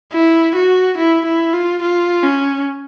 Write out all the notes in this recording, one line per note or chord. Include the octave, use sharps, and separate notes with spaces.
E4
F#4
E4
E4
F4
F4
C#4